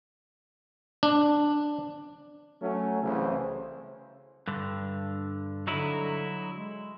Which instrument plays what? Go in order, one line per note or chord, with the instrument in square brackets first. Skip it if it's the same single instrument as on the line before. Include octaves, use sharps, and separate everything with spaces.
[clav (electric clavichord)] D4
[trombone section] F#3 A3 C#4
C2 C#3 E3 A3 C4 C5
[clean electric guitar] G2 D3
[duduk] D3 [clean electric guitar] F#3 D#4 E4
[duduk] G#3